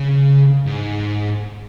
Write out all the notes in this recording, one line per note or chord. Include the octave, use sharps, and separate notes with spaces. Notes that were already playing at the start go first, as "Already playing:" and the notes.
Already playing: C#3
G#2